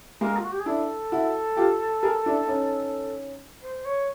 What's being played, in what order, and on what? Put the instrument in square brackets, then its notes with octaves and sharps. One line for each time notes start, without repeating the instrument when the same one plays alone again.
[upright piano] G#3 A#3 [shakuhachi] A#4
[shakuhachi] F4
F#4
G4
G#4
[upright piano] D4 E4 [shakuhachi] A4
[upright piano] E4 F#4
F4 G4
G#4 A#4
D4 E4
C#4 D#4
[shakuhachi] C5
C#5